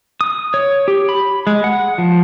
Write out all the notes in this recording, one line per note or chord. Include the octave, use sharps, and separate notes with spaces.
D#6
C#5
G4
B5
G#3
F#5
F3